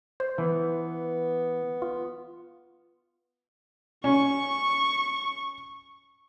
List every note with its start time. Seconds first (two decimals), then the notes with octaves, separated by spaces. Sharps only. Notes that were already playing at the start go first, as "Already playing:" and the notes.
0.20 C5
0.38 E3 B3
1.82 F4
4.04 C#4 C#6